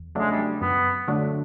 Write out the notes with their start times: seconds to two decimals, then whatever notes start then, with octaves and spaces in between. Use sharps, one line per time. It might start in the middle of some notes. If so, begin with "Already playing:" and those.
Already playing: E2
0.15 C#3 F#3 G#3 A3 D4
0.31 G3
0.61 F#2 B3
1.08 D3 F#3 A3 D4